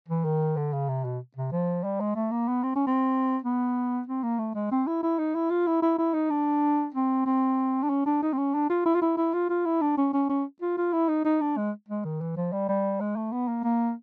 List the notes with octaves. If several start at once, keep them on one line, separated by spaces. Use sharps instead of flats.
E3
D#3
D3
C#3
C3
B2
C3
F3
G3
G#3
A3
A#3
B3
C4
C#4
C4
B3
C4
A#3
A3
G#3
C4
E4
E4
D#4
E4
F4
E4
E4
E4
D#4
D4
C4
C4
D4
C#4
D4
D#4
C4
C#4
D4
F4
E4
F4
E4
E4
F4
F4
E4
D4
C#4
C#4
C#4
F4
F4
E4
D#4
D#4
D4
G#3
G#3
D#3
E3
F3
G3
G3
G#3
A3
B3
A#3
A#3